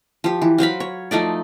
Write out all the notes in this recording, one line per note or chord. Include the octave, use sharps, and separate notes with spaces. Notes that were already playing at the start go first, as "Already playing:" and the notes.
F3 G4
E3
F#3 C5 F5 B5
C#5
F3 A3 D#4 D5